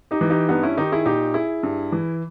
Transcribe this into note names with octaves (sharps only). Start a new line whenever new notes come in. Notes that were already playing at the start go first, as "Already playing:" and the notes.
D#4 G4
E3
D#4 G4
G2 B3 D#4
C#4 E4
D#3 D#4 G4
E4 G#4
A#2 D#4 G4
E4 G#4
G2
E3